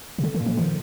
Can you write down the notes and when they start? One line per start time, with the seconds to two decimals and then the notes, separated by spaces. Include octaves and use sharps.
0.18 C3
0.24 D3 A3
0.34 D#3
0.40 A#2
0.46 F3
0.57 D#3 F3